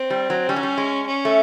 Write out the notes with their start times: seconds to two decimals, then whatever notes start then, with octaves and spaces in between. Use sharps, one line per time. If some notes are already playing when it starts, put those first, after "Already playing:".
Already playing: C4
0.10 G3
0.30 F#3
0.49 G3 C#4
0.56 F#3
0.63 G3
0.78 G#3
1.07 C#4
1.25 A3